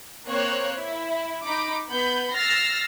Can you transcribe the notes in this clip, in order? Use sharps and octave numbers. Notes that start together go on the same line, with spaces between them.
A#3 C4 C5 C#5 F#6
E4
D#4 B5 D6
B3 B5 G6
E6 F6 A6 A#6 C7